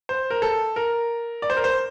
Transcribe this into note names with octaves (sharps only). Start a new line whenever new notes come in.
C5
A#4
A4
A#4
D5
C5
A#4
C5